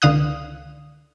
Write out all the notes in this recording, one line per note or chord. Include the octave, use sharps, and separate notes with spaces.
C#2 D3 F5 D#6 F#6